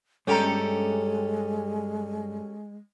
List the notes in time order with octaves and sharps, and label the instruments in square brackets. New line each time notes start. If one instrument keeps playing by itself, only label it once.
[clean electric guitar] G2 G5 A#5 [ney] G#3 [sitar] C#4 G4 A4